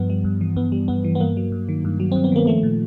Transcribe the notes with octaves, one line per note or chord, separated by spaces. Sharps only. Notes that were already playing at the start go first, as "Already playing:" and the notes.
Already playing: G2 F3 B3
G3
G2
E3
G2 B3
G3
G2 B3
E3
B3
G2 A#3
F#3
G2
D#3
G2
F#3
G2 C4
B3
D#3 A#3
F3 A3
A#2